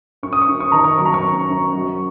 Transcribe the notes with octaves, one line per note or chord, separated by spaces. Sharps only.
F#2 C#6
D#6
C#6
F#2
C#6
D#3 A#5
C#6
F#3 C#6
A#5
C#6
C#4
F#2
F#3